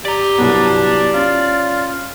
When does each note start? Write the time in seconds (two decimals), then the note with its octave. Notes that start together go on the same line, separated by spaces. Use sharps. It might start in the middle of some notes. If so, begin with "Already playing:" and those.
0.05 G4 D5 A#5
0.38 C2 F#3 B3 D4
1.14 C#4 F4